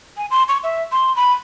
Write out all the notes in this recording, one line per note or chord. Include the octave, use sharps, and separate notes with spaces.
G#5
C6
C#6
E5
C6
B5